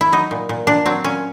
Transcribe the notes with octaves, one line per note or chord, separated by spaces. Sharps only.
E4
F#3 D#4
A#2
A#2
A#2 D4
F#3 C4
A#2 C#4